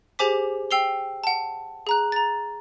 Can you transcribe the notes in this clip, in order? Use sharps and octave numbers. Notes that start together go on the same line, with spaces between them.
G4 G#4 C5 G#5 D6 B6
G5 E6 C7 F7 G7
F#5 A5
G#4 A#5 F#6
A#5 A6